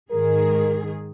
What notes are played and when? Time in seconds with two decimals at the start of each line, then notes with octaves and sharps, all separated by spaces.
0.11 G#2 D#3 G#4 A#4